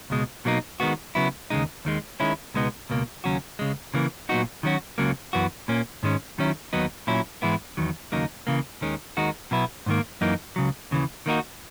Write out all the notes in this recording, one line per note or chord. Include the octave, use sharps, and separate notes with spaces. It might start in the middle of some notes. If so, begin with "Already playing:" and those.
C#2 B2 G#3
B2 F#3 A#3 D#4
D#3 G#3 B3 F#4
C#3 F#3 B3 E4
D#2 C#3 G#3 D#4
D#2 D#3 G#3
D#3 G#3 C#4 E4
C#2 B2 G#3 B3 D#4
C#2 B2 A#3
D#2 C#3 F#3 C#4 F#4
C#2 C#3 G#3
C#3 E3 A#3
A#2 F#3 B3 D#4 F#4
D#3 F#3 C#4 F#4
C#2 C#3 F#3 A#3
F#2 E3 B3 F#4
A#2 A#3 C#4
G#2 D#3 G#3 C#4
D#3 F#3 C#4 E4
D#2 D#3 F#3 B3 D#4
A#2 F#3 C#4 E4
G#2 E3 G#3 B3 E4
E2 D#3 F#3
D#2 C#3 F#3 A#3 D#4
C#3 E3 A#3
D#2 D#3 G#3 C#4
D#2 D#3 G#3 D#4 F#4
B2 F#3 B3 E4
G#2 D#3 A#3
F#2 E3 A#3 D#4
C#2 C#3 F#3
D#2 C#3 E3
D#3 A#3 D#4 F#4